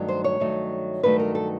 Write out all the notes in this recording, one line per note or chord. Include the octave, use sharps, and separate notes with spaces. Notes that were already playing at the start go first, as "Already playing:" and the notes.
Already playing: G2 D#3 F#3 A3
C5
C#5
G2 D#3 F#3 A3
G2 D#3 F#3 A3 B4
A#4
A4